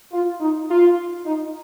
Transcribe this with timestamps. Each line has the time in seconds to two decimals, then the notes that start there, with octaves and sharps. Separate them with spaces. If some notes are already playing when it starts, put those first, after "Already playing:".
0.13 F4
0.41 D#4
0.69 F4
1.25 D#4